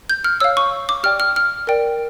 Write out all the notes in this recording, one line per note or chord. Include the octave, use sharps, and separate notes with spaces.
G6
F6
C#5 F5 E6
C#6
D6
G4 D5 G5 F6
F6
F6
A#4 D5 G5